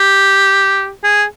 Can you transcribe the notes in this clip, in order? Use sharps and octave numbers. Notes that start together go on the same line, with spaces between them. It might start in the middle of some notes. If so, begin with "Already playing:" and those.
Already playing: G4
G#4